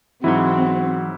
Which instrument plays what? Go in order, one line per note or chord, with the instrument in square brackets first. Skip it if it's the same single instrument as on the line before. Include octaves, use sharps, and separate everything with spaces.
[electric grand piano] G#2 E4 [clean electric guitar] E3 F#3 [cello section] C4 [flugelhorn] F#4